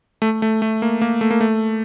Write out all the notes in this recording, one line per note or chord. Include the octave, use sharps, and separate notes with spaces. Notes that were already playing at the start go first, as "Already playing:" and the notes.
A3
A3
A3
A#3
A#3
A3
A#3
A3